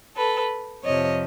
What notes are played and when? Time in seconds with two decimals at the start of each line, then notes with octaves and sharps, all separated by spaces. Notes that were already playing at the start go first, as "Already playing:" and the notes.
0.16 A4 B4
0.84 F2 C3 F3 C#5 D#5